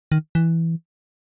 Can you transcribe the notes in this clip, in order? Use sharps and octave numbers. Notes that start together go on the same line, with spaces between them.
D#3
E3